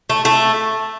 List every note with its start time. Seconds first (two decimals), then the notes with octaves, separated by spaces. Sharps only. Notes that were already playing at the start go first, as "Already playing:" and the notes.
0.10 A3
0.25 A3